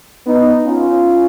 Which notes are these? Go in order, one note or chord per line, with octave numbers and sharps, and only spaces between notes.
B3 D#4
C#4 F4